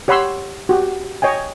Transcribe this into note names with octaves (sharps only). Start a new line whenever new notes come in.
G4 C#5 F#5 B5 C6 E6
F#4 G4
C#5 D#5 G5 G#5